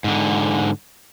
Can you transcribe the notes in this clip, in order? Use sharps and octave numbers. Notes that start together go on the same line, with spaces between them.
G#2 D3